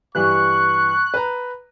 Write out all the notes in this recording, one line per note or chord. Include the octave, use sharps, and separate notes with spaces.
G2 E3 G3 C#6 F#6
B4 A#5